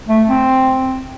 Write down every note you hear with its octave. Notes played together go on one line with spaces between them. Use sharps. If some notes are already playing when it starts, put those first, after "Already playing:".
A3
C4